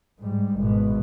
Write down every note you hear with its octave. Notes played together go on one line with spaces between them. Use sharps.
G#2 G3
G#1 B2